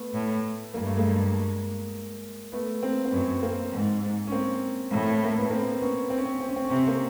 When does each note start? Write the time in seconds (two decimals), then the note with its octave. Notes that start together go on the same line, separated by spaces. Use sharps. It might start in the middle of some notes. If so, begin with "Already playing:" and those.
Already playing: A3 B3
0.14 A2
0.74 G2 A#3
0.86 A3
0.97 G#3 A#3
2.52 A3 B3
2.83 A#3 C4
3.06 C4
3.12 F#2 B3 C#4
3.43 A#3 C4
3.72 G#2
4.27 C#4
4.32 A#3 C4
4.91 A2
5.11 A3
5.24 A#3
5.37 B3
5.50 A#3 C4
5.81 B3 C#4
6.10 C4
6.18 C#4
6.25 C4
6.33 C#4
6.40 C4
6.48 C#4
6.56 C4
6.64 C#4
6.70 C3 C4
6.79 C#4
6.87 A#3 C4